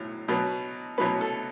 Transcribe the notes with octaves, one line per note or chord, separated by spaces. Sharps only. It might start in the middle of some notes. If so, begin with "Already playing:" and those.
Already playing: B1 A2 F#3
B2 F#3 B3
B2 F#3 B3 B4
A4